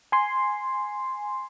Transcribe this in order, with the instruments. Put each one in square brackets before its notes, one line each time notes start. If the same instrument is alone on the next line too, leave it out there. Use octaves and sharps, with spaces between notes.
[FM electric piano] G#5 C6